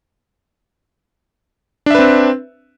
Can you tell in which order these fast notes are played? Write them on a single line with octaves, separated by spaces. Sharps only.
D4 E5 B4 C4